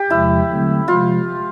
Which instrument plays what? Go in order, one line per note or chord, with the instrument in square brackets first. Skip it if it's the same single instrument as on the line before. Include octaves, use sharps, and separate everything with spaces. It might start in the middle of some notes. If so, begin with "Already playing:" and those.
Already playing: [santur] G4
[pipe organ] E2 C3 F3 G#3 [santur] E4
[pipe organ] D3 F#3 A3 C4
[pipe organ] C3 F3 G#3 [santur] F4